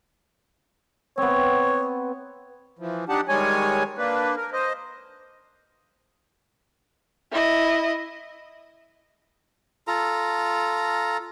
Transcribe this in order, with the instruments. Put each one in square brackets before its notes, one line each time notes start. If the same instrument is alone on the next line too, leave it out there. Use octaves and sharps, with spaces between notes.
[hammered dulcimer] B3 C4 [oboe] C#5
[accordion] E3 F3
D4 D#4 G4 F#5 A5
D#3 G3 G#3 C#5 G#5
A#3 D4 B4
A#4
C5 D#5
[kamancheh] E4 D#5
[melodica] F4 A4 A#5